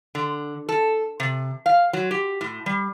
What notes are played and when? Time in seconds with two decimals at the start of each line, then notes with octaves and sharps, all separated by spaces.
0.15 D3
0.69 A4
1.20 C3
1.66 F5
1.93 F#3
2.11 G4
2.41 A2
2.66 G3